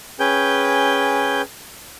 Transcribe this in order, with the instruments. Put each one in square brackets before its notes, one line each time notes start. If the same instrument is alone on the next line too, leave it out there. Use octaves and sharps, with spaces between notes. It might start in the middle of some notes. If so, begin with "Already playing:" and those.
[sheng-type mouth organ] C#4 G#4 B4 G5 G6